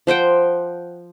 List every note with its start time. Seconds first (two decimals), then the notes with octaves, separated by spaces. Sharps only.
0.07 F3 C5 F#5 G5